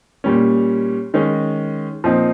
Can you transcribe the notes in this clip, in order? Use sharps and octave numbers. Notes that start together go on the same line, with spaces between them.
A#2 G3 C#4
D#3 G#3 C#4
A#2 F3 C4 D#4